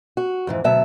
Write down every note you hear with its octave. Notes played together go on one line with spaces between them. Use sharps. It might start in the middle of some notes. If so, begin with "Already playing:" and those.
F#4
F2 G#2 E3
D2 B2 F#3 E5 A5